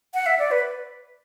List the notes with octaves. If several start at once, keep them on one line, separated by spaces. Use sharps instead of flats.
F#5
E5
D5
B4